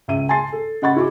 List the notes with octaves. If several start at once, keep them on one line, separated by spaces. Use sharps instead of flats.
C#2 E5 D#7
G#5 A5 C6 A6 C7
A4
C#3 D#5 F#5 B5 C#6 A6
E4 F#4 G#4 D6